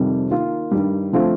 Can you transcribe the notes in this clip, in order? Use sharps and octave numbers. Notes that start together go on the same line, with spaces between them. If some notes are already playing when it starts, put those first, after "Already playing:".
Already playing: F2 C3 D#3 G3
D#3 A#3 F4
G2 D#3 G3
D3 F3 A3 C4 F4